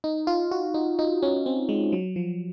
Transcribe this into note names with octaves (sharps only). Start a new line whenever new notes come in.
D#4
F4
F#4
D#4
D#4
C#4
C4
G#3
F#3
F3